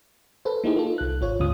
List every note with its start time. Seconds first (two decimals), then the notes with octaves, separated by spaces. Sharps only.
0.45 A4 B4 C5
0.64 A#3 D#4 E4 G4 G#4
0.76 F4 A4
0.98 C2 F#6
1.21 G#1 F4 C#5
1.39 D2 G#2 C#3 F4 D#6